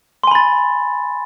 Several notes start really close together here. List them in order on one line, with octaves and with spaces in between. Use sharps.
C6 G#5 B5 A6